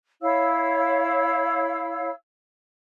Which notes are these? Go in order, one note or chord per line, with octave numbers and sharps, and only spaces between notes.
E4 C#5 F5 E6